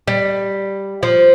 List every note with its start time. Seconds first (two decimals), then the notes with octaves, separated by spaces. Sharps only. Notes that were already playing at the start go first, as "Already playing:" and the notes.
0.08 G3
1.03 F3